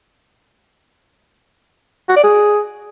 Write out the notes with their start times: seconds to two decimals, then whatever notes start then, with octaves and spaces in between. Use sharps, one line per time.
2.09 F#4
2.16 D5
2.23 G#4